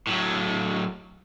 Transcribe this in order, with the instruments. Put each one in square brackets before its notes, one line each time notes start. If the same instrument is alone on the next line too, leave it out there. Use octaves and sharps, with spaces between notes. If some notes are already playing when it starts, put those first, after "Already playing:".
[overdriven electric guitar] A2 F#3